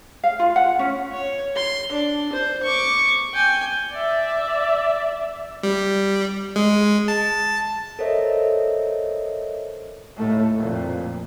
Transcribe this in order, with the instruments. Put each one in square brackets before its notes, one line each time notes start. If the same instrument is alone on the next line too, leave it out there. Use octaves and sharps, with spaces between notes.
[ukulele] F5
F4
F#5
C#4
[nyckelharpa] C#5
C6
D4
C5
C#6 D6
G5 G#5
[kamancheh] D5 E5
[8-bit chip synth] G3
G#3
A5
[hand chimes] A4 A#4 C5 C#5 D#5 E5
[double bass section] D#2 A2 A3
F2 A#2